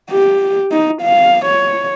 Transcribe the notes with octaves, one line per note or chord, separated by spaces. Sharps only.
G4
D#4
F5
C#5